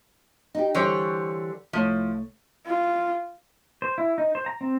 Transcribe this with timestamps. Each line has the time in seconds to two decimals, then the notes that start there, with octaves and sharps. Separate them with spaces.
0.55 D#4 G4
0.75 D3 E3 G3 C5 C#5
1.73 C2 F3 A3 E4 C#5
2.66 F4
3.82 C5
3.98 E4
4.18 D#4
4.35 C5
4.46 A#5
4.61 C4